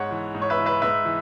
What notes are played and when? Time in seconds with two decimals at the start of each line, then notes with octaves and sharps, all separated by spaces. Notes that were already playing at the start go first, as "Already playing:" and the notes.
Already playing: G#2 C#5 F#5
0.11 E3
0.34 G#2
0.42 C#5
0.50 B4 E5
0.59 E3
0.66 B4 E5
0.82 G#2 B4 E5
1.05 E3